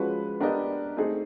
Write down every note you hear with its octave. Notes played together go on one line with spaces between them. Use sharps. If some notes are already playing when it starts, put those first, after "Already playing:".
Already playing: F3 G#3 C#4 F#4 B4
B3 D4 G4 A#4 D#5
A3 C4 D#4 G#4